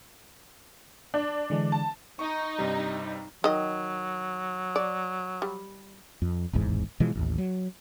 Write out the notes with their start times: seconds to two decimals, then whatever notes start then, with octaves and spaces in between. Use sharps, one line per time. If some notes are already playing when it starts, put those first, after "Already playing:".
1.14 D4
1.50 D3 E3 G#3
1.72 A5
2.19 D#4 C#6
2.59 G2 C3 G3
3.44 D#3 F#3 D#5
4.76 D5
5.42 G3
6.22 F2
6.53 D1 G#1 E2 G#2
7.00 B2 E3 F3 G#3
7.16 A1 D#2
7.38 F#3